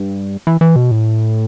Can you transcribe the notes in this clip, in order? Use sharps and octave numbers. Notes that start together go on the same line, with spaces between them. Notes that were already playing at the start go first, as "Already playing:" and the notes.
Already playing: G2
E3
E3
B2
A2